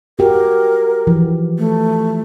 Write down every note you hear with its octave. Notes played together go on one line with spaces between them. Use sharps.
F#4 G4 A#4
E3 F3
A3